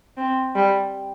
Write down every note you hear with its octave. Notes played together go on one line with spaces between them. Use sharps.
C4
G3